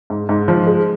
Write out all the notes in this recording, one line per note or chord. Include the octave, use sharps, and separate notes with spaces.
G#2
G#2
F3
G#3